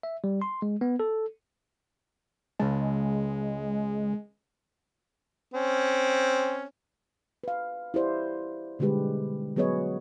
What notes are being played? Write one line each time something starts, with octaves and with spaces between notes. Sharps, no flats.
E5
G3
C6
G#3
B3
A4
C#2 G#3 A5
C4 C#4
B4 F5
E4 G4 C5 D5
B2 D3 G3 G#3 G4 B4
F#3 B3 G#4 B4 C#5 D#5